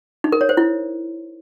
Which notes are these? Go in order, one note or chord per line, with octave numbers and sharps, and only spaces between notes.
D#4
A#4
C#5
C5
E4